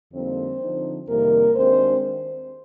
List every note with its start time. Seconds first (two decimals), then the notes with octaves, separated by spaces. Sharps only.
0.12 F2 D3 G3 A#3 C4 D#4 C5
0.60 D3 F3 C4 D#4
1.08 F2 C3 D#3 G3 A#3 A#4
1.55 D#2 D#3 G#3 C4 D4 C5